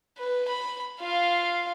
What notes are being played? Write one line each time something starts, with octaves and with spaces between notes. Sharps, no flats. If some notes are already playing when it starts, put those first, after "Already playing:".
B4
B5
F4 F5